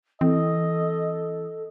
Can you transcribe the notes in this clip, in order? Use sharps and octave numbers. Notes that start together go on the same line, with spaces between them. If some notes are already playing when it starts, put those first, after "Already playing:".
E3 C4 A4 D#5